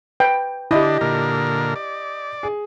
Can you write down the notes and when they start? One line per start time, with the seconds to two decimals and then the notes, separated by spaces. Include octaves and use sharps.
0.20 B4 G5
0.71 D3 D4 E4 G4 D#5
1.01 A#2 D3 A#4
1.76 D5
2.43 G#4